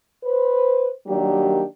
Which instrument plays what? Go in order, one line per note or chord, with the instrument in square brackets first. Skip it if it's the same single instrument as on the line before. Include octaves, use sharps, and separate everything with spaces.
[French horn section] B4 C5
D#3 F#3 G3 A#3 D4 G4